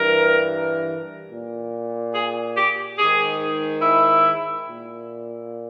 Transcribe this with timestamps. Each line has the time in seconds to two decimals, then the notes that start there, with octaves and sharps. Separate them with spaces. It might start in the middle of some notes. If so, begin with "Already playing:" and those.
Already playing: G2 E3 A#4
1.30 A#2
2.15 G#4
2.57 G4
2.98 G#2 D#3 G#4
3.82 E4
4.67 A#2